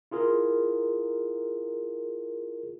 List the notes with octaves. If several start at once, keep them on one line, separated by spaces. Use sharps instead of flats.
E4 F4 G#4 A#4